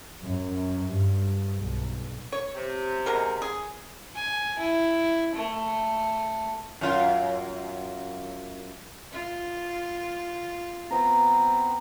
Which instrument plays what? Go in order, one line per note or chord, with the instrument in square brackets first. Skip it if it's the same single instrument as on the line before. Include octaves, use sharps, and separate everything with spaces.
[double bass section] F#2
G2
B1
[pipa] C#5
[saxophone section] C3
[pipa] B2 G#3 A#4
G#4
[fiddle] G#5
E4
A3
[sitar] F#2 F4
[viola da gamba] F4
[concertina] B3 C4 [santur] A#5